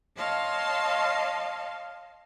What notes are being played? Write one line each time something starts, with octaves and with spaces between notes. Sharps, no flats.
C#5 D#5 F5 A5 C6